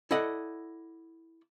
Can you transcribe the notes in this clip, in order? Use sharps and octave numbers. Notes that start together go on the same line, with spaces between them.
E4 A4 D5 D#5 F#5